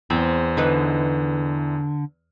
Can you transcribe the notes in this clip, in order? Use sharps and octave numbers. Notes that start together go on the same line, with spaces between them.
E2 C4
D3 E3 D#4 B4